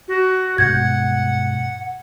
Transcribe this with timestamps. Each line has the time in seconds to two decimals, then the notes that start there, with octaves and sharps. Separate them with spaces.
0.08 F#4
0.58 G2 B2 G#3 F#5 G6 G#6